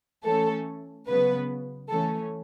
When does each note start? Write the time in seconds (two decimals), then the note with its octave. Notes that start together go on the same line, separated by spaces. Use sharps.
0.25 E3 A3 C#4 A4
1.07 C#3 F#3 B3 B4
1.89 E3 A3 C#4 A4